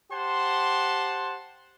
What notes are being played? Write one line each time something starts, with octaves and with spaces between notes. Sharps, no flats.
G4 C5 F#5 A5 C6